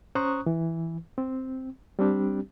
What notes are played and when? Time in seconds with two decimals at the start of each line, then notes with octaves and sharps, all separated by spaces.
0.15 C#4 C5 A#5 C#6 D#6 F#6
0.46 E3
1.18 C4
1.99 G3 C4 D4 G4